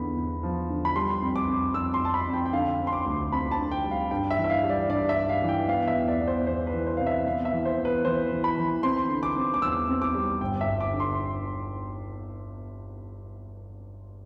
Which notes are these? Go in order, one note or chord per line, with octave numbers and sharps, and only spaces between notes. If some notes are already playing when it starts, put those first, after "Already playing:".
Already playing: E2 D3 F3 B5
E2
F3
D3
B5
G3 C6
F2
D6
F2
F2 E6
C6
F2 A5
B5
F2
G5
G5
D3 F5
C4
C6
D6
D2
C4 B5
A5
D3
G5
G3
F5
G2 G5
E5
E3
E5
F5
G3
D5
G2 D5
E5
G2
F5
E3
G5
B3 F5
E5
E2
D5
B3
C5
E2 C5
B4
E3
C5
C3 F5
E5
B3 F5
E5
E3
C5
B3
B4
E3 C5
E3
B5
E3
C4 C6
D3
D6
C4
D6
E2 E6
C4
D6
G3
G1 G5
E5
G1
D6
D3
C6